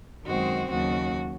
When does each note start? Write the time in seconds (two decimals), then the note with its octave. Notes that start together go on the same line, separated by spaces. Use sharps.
0.25 F#2 D#3 G#3 C4 F#4
0.69 D#2 C#3 F#3 F#4